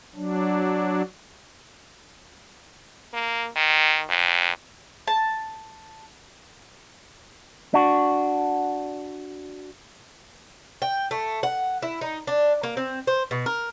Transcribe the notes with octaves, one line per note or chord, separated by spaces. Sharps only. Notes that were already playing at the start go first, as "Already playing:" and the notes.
F#3 D4
A#3
D#3
F2
A5
D4 F#4
G5
A3
F#5
E4
D#4
D4
A#3
C4
C5
B2
A#4